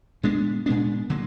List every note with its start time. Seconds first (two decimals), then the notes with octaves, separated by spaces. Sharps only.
0.23 A#2 G#3 B3 D4
0.66 A#2 G#3 B3 D4
1.10 D3 F#3 A#3